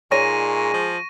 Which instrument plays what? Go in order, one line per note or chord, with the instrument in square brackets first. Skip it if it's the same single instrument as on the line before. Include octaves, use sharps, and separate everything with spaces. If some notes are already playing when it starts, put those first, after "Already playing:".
[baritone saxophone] A#2 [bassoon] G#3 [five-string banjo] D#4 C#5 D5 [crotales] C#6 A#6 D#7
[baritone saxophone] F3